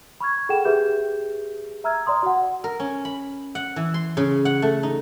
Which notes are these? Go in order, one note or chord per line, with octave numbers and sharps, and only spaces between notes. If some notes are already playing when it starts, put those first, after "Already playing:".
B5 C#6 F6 G#6
G#4 A4 F#5 G5 E7
G4 G#4 B4 E5 B5 G6
E5 A#5 E6 F6 G#6
D5 A#5 C6 D#6
F#4 F#5
A#4
C#4
B5
F#5
E3
C6
C#3
F#5
A3
D#4